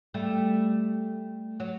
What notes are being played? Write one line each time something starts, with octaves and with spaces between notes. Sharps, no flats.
G3 A3
F#3